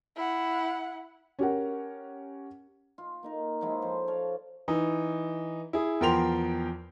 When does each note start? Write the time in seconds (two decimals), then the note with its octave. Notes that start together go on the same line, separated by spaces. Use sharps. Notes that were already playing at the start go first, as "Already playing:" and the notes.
0.16 E4 F#5
1.39 C#4 G4 A#4 F#5
2.98 F4
3.23 A#3 D#4 A#4
3.61 F3 F#3 G#3 E4
3.82 F3 A4 C5
4.08 A4 C#5 D5 F5
4.68 E3 D#4
5.73 E4 G#4
6.01 E2 F3 A#4 G5 C6 F7